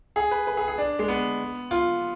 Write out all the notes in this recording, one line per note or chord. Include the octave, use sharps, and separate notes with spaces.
G#4
B4
B4
G#4
G#4
D4
G#3
B3
F4